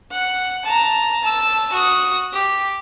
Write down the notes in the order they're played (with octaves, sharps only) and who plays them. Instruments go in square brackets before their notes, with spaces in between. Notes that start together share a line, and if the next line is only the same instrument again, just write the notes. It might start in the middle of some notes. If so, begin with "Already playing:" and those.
[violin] F#5
A5 A#5
A5 E6
F#4 D#6
G4